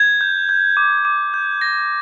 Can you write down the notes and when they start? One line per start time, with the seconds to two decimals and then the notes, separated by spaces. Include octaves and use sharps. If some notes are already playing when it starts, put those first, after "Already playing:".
Already playing: G#6
0.21 G6
0.49 G6
0.77 D6
1.05 D6
1.34 G6
1.61 G6 A#6